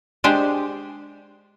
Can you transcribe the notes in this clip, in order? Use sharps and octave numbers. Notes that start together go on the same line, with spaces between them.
G#3 D4 G4 C5